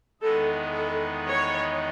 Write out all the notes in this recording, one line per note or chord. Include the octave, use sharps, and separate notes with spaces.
E2 D#3 G#3 B3 D#4 A4
A4
C#5